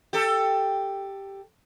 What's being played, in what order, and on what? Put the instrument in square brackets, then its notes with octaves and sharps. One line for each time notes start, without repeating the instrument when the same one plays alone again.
[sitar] G4 A4